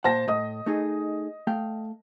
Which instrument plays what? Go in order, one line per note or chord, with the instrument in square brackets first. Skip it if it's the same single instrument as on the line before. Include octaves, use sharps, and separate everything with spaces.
[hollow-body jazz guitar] A#2 F#5 [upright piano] C5 A5 A#6
[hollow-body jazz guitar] A2 [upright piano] D#5 D#6
[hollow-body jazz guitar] A3 D#4 G#4
A3 F5 G5